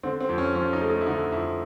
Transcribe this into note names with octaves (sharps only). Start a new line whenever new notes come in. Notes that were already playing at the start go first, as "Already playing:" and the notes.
D3 C4
C4
F2
C#4
F3 C#4
D#4
A3
D#4
E4
D3 D#4
F2 E4